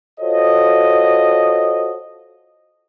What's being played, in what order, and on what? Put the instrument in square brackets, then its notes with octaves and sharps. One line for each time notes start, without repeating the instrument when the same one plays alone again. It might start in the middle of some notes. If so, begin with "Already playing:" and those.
[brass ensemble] F4 F#4 A4 C5 C#5 D#5